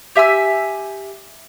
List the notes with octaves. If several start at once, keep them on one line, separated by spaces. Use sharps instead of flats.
G4 E5 G#5 E6